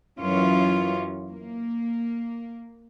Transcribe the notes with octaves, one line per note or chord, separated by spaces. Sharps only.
F#2 E3 F#3 C#4 F4
A#3